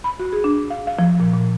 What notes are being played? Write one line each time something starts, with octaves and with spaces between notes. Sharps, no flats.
B5
F#4
G#4
D4
F5
F5
F3
A#2
A#2